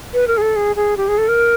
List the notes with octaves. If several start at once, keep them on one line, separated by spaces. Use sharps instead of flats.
B4
A#4
G#4
A4
G#4
G#4
G4
G#4
A4
A#4